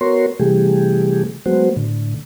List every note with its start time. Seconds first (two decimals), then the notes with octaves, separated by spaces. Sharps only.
0.01 B3 F#4 A#4 C#5 C6
0.40 C3 E3 G3 A3 G4 G#4
1.46 F#3 G#3 A3 B3 F#4 C5
1.76 A2 D3